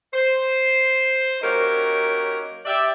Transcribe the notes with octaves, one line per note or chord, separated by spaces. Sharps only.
C5
F#3 A#3 C#4 D#4 G4 A#4
G4 D5 E5